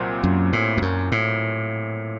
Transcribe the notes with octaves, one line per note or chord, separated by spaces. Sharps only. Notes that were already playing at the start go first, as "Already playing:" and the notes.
Already playing: C2 A#2 F#3 C4
F#2
A2
F2
F#2
A2